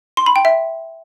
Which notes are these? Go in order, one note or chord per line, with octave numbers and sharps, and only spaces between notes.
C6
B5
G5
E5